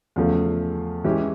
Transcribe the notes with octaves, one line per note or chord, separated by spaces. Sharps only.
E2 C#3 F3 A3
E3 G#3 C#4 E4 G4